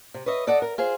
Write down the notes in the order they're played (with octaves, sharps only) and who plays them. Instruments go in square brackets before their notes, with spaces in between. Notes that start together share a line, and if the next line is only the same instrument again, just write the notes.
[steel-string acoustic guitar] C3
B4 C#5 D#5 E5
A4 D5 D#5 F#5
A#4
F4 G#4 C5